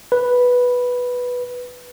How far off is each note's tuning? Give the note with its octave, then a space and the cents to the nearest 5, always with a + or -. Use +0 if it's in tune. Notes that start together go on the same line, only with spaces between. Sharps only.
B4 -5